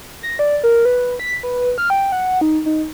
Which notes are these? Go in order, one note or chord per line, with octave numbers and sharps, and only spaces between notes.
A#6
D5
A#4
B4
B6
B4
F6
G5
F#5
D#4
D#4